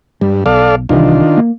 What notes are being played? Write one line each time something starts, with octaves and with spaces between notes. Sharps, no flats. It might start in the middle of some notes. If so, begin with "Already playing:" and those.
G2 G3
B1 A4 D5 F5
C2 C3 D#3 E3 D4 F4
A#3